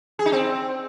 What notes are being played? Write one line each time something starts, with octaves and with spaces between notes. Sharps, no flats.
G#4
D#4
C4